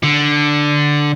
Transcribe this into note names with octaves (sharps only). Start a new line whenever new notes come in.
D3